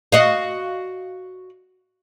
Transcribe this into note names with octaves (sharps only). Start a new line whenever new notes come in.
F#4 D#5 F5